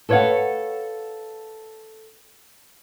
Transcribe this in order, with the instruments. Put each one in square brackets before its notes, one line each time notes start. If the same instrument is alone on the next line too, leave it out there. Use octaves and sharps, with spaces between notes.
[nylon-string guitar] A4 B4 C#5 D5 F5 F#5